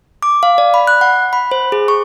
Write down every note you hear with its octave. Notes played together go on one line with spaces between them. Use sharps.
D6
F5
D5
B5
F#6
F#5
B5
C5
G#4
C#6